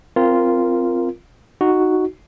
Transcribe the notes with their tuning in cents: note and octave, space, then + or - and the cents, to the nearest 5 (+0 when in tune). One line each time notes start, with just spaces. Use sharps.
C4 +0 F4 -10 A#4 +0
D#4 +0 F#4 +0